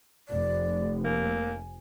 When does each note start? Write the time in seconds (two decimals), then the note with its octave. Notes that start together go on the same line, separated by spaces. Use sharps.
0.28 F1 D5
1.04 A#3 G#5